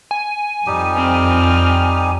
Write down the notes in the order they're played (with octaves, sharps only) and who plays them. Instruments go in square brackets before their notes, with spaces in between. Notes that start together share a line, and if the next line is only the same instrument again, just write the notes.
[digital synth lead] G#5
[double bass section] F2 [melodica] G3 D#4 G4
[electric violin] C4 F6